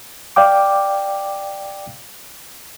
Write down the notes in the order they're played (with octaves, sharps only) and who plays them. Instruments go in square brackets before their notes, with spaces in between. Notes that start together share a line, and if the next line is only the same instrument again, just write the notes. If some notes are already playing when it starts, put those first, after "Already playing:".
[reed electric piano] D5 F5 G5 D6